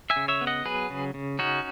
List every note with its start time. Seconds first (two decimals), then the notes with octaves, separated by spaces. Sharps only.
0.10 E5 G#5
0.16 C#3
0.28 C#5 E5
0.41 B3
0.47 D#5 F#5
0.65 F#3 G#4 B4
0.90 C#3
1.14 C#3
1.39 C#4 D#4 F#4